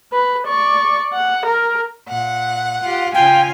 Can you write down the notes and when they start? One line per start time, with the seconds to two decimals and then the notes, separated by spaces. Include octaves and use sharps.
0.12 B4
0.47 D5 C#6
1.13 F#5
1.47 A#4
2.09 A#2 F#5
2.83 F4 G4
3.14 C#3 F4 G5 G#5